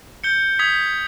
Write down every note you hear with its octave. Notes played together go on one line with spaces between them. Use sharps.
G6 C#7 G7
D#6 G#6 B6